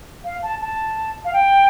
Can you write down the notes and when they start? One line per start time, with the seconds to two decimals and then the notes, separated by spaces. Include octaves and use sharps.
0.24 F5
0.43 A5
0.61 A5
1.25 F5
1.33 G5